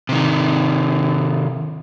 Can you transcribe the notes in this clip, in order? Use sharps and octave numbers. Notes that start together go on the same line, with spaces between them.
C3 D#3